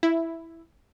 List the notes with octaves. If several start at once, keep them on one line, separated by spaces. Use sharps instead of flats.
E4